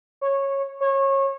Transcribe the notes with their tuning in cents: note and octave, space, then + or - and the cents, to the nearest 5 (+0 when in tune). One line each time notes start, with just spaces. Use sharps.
C#5 -15
C#5 -25